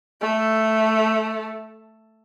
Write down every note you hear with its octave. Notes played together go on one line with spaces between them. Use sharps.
A3